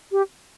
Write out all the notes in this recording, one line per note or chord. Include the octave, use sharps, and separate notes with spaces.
G4